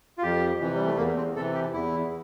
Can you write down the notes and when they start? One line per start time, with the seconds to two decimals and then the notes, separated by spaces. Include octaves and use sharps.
0.18 F4
0.23 F2 G4
0.60 C3 E3
0.75 G3
0.87 A3
0.97 E2 A#3
1.16 C4
1.36 C3 E3 A4
1.55 G4
1.73 E2 E4